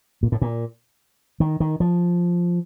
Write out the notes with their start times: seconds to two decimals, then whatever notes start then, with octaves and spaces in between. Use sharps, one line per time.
0.23 A#2
0.32 A2
0.42 A#2
1.40 D#3
1.60 D#3
1.80 F3